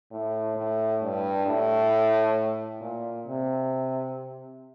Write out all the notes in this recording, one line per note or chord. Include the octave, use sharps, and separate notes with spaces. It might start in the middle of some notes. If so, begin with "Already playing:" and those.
A2
A2
G2
A2
A#2
C3